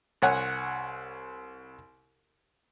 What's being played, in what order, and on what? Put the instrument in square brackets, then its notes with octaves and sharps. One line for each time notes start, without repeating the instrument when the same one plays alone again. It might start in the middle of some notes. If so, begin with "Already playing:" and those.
[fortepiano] C2 C#5 F#5 G#5